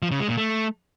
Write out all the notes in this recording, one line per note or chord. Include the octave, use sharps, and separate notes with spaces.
F3
C#3
G#3
A#2
A3